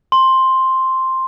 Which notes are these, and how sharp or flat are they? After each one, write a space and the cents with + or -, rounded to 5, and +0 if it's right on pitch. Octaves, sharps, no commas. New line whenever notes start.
C6 +5